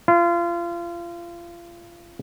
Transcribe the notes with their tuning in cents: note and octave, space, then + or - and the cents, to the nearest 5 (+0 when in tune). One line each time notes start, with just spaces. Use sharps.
F4 -30